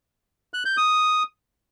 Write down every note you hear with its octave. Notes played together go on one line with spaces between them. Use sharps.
F#6
G6
D#6